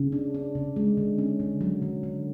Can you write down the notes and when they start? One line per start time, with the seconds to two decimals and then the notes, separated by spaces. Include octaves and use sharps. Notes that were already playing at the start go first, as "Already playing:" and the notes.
Already playing: C#3
0.12 D4
0.35 D4
0.55 C#3
0.76 G#3
0.97 D3
1.18 C#4
1.40 D3
1.61 F#3
1.82 D3
2.03 D3